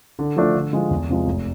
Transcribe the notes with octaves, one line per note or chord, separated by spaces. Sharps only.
D3
F3 A3 D4
D3
F3 G#3
E2
C3 F3 G#3
F1